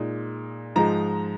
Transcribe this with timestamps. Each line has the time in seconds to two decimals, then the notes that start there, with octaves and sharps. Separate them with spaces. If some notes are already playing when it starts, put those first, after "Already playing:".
Already playing: A#2 G#3 D#4
0.76 G#2 F3 G#3 D#4 A#5